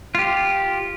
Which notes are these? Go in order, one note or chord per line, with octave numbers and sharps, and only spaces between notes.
F4 G4